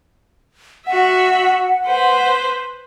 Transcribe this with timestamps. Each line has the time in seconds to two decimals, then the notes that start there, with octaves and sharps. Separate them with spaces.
0.87 F#4 E5 F#5
1.86 B4 C5